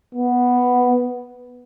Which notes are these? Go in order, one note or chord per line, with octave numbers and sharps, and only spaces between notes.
B3